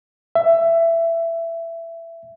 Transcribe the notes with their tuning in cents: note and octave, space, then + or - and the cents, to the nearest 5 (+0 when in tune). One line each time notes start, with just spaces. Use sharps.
E5 +15